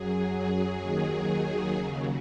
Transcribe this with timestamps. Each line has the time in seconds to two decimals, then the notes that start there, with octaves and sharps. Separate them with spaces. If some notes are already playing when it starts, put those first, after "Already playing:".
Already playing: F#2 F#3 G#4
0.37 G#4
0.82 D#2 D#3 F#3
1.28 G#4
1.73 D#2 C#3 F#3